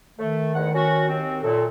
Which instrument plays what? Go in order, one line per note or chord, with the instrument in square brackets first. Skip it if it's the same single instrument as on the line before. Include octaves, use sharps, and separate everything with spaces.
[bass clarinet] D#3 [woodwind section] A3
[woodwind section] E2 G#2 F#5
C#4 F#4
D#2 C4
[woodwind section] F#2 A#2 [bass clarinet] A4